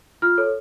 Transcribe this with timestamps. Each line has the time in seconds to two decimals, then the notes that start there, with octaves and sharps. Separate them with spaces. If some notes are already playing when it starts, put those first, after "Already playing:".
0.22 F4 F6
0.38 A4 C#5